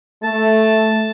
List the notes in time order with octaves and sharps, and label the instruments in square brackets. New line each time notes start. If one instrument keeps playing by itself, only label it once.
[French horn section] A3 [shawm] A5